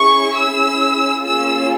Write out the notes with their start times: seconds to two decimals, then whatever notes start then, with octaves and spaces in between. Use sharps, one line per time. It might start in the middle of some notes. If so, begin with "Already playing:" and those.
Already playing: C#4 E4 G#4 C#6
0.36 E6
1.23 A#3 C#4 F4 G#4 E6